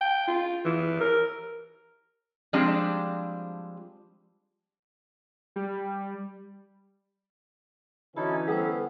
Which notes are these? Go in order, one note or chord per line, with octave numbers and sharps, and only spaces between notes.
G5
F4
E3
A#4
F3 G3 G#3 C4 D4
G3
D3 E3 C#4 D#4 E4 F#4 A4
G3 B3 A4 C5